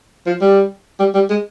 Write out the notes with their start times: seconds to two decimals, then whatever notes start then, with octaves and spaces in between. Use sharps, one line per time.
0.26 F3
0.41 G3
0.99 G3
1.14 G3
1.30 G#3